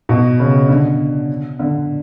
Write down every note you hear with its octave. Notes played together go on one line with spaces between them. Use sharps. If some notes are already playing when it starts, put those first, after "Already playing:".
B2
C#3
D3
D3